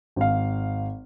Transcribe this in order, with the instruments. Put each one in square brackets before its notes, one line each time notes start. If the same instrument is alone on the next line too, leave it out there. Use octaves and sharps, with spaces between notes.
[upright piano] G#1 F5